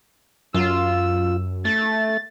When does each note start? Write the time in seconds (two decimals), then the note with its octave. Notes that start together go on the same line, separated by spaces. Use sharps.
0.54 F#2 F4 E6
1.65 A3 A6